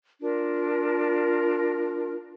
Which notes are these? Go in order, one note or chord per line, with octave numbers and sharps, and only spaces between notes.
D4 F4 A#4